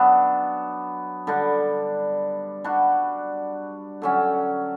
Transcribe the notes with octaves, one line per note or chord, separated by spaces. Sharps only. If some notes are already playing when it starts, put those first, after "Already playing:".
Already playing: F#3 B3 D4
D3 G3 D4
G3 D4 F#4
D3 F#3 C#4